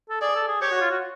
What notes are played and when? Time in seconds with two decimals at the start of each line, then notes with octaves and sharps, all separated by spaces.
0.10 A4
0.21 G#4 D5
0.35 A4
0.48 G#4
0.61 G4 C#5
0.72 F#4
0.81 F4
0.91 F#4